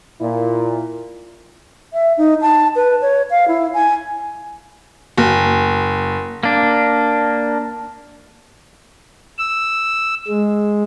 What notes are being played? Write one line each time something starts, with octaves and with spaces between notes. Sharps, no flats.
A#2 E4
E5
D#4
A5
B4
C#5
F5
E4
G#5
F#1
A#3 D4
E6
G#3